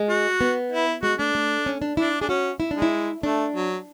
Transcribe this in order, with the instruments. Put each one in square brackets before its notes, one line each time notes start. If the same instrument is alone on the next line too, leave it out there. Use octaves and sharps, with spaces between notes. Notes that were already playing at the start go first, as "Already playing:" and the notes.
Already playing: [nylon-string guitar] G#3
[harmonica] F#4
[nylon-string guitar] B3
[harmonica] E4
[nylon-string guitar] G#3 [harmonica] F#4
[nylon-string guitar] A3 [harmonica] D4
[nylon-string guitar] A3
C#4
D4
[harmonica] D4 [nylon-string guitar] E4
[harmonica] D4 [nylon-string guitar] G#4
[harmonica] C#4 [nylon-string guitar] F#4
[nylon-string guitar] E4
[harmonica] G#3 [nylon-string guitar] D4
[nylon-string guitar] E4
[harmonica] A3 [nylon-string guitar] D4
[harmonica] F#3